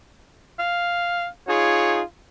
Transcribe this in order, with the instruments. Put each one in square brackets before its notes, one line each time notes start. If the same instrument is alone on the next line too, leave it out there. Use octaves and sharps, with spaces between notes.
[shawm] F5
[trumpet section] D#4 F4 G#4 [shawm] C#5